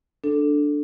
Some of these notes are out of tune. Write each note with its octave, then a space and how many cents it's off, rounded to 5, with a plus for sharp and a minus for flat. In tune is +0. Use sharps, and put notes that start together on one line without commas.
D4 +0 A4 +0